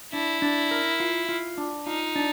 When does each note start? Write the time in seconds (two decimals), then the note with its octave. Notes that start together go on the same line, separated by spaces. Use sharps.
0.13 D4 E4
0.42 D4
0.71 A#4
1.00 F4
1.29 F4
1.58 D4
1.87 D#4 F4
2.16 D4